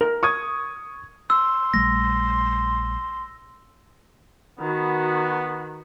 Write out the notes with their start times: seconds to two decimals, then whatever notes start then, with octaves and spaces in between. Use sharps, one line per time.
0.01 A#4
0.23 C#6 D#6 G#6
1.30 C6 E6
1.74 A#1 G3 A3 A#6
4.60 D#3 B3 F#4